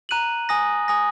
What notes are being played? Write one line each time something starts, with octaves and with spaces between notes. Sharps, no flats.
A#5 F#6 D#7 F#7
G#5 D#6 A#6
G#5 D#6 A#6